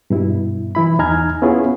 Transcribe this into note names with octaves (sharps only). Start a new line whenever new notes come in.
G2 B2 E4
E3 E4 B5
E2 D#4 G#5 A#5 F6 G#6
B3 C#4 E4 F4 G#4